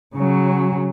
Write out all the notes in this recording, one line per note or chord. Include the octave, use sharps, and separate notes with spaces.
C#3 F#3